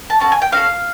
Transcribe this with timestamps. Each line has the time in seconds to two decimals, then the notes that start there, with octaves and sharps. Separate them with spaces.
0.10 A5
0.20 C#4 F#4 A4 A5
0.32 G#5
0.42 G5
0.52 C#4 F#4 A4 F5